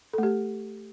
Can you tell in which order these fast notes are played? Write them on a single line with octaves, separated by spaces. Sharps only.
A4 A3 G4